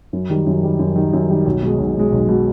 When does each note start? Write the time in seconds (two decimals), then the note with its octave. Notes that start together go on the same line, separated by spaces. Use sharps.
0.13 F#2
0.30 D#3 G3
0.46 F#2
0.63 D#3 G3
0.79 F#2
0.96 D#3 G3
1.13 F#2
1.29 D#3 G3
1.46 B1
1.62 B2 G#3
1.78 B1
1.95 B2 G#3
2.12 B1
2.28 B2 G#3